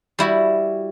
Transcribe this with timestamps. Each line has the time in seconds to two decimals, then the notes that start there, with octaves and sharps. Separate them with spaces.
0.19 G3 E4 F#4